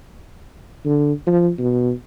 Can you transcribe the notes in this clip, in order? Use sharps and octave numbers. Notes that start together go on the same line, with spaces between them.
D3
F3
B2